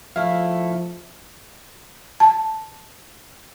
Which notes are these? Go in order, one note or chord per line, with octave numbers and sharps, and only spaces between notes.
F3 A3 E4 F5
A5